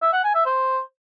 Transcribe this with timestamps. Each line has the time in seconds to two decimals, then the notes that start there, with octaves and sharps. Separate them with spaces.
0.02 E5
0.13 F#5
0.24 G#5
0.34 E5
0.45 C5